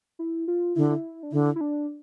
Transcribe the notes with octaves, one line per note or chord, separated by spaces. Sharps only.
E4
F4
D3 E4
E4
D4
D3 E4
E4
D4